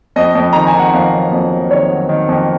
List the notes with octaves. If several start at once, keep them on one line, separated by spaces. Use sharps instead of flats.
F2 D#5
F2
D#3 A#5
G#5
D#3
F#5
F2 F5
F#3
F2
F#3
D#3 C#5
F#3
D#3
F2